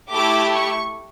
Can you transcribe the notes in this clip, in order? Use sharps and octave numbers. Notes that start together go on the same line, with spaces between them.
A3 E4 G4 D6
C#6